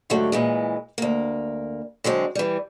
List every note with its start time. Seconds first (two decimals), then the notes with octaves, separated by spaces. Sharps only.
0.10 G#2 D3 F#3 G3 A3
0.32 A#2 E3 G#3
0.98 D2 A#3
2.04 D3 F#3 G#3 C4
2.35 E3 G3